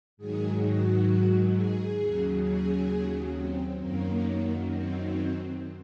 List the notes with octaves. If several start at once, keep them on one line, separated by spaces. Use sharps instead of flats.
G#2 D#3 F#3 G#4
F#4
G#4
D#2 C#3 F#3
G#4
C4
F#2 D#3 F#3 A#3
C4